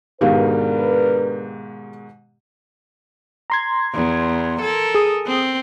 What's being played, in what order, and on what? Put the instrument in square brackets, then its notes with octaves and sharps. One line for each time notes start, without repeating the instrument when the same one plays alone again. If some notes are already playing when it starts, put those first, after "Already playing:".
[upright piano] G#2 B2 D#3 [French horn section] D4 A#4 B4 [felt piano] G4 F5
[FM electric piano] A#5 C6 G#6
[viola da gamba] E2
A4 A#4
[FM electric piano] G#4 D#6
[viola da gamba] C4